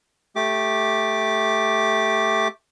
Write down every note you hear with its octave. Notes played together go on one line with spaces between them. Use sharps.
A3 G4 D6